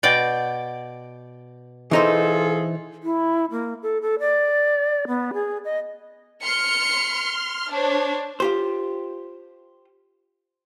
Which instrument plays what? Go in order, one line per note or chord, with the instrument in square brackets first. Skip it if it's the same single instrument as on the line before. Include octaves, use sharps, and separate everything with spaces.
[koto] B2 D5 G5
[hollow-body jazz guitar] E3 D#4 C5 [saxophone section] F4 G#4 A4
[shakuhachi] E4
A#3
A4
A4
D5
B3
G#4
D#5
[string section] C6 F6 [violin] C#7
[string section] D4 C5 [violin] C#5
[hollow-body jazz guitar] F4 G4 C5